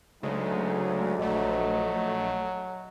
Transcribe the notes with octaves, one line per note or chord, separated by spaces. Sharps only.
D2 C#3 F#3 G#3 A3 D#4
A#1 F#3 A3 D#5